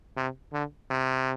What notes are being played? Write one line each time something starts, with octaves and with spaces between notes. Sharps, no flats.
C3
D3
C3